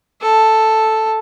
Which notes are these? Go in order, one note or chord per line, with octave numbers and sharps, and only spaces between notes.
A4